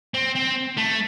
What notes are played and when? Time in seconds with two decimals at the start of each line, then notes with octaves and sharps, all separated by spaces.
0.14 C4
0.35 C4
0.78 A3